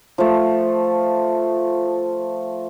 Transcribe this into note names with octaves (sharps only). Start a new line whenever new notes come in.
F3 A3